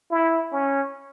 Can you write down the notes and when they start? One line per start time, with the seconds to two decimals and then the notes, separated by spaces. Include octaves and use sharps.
0.11 E4
0.52 C#4